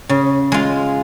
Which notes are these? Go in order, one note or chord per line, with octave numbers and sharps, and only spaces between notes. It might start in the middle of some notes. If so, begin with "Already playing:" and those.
C#3
G#3 F4